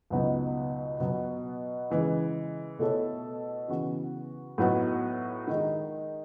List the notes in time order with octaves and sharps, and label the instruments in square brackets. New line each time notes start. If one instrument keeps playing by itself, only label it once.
[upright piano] C#2 B2 F#3 B3 D#4
B2 F#3 B3
C#3 E3 G#3
B2 A3 E4 A4 C#5
C#3 E3 B3 F#4
A2 F#3 B3 D#4 F#4
D#3 G#3 D#4